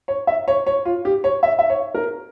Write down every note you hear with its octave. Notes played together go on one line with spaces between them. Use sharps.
C#5
E5
C#5
C#5
F4
G4
C#5
E5
E5
C#5
A#4